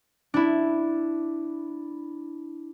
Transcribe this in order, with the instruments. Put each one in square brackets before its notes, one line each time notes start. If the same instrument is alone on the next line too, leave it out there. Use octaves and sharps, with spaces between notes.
[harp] D4 E4